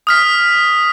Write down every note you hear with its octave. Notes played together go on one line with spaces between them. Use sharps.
D#6 F6 B6